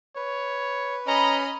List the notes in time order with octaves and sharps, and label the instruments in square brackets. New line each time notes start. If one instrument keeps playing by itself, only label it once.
[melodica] B4 [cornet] C#5
[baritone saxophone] C#4 [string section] D#5 B5 [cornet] A#5